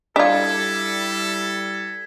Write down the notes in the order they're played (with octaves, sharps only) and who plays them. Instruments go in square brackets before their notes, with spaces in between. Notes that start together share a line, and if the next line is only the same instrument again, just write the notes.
[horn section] G3 E4 A4 [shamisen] D4 F4 [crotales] G#6 B6